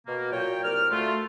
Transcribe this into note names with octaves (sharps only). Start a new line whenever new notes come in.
B2 A#3
A#2 F#3 C#5 G5
C2 A#4 D5 F6
D2 A3 F4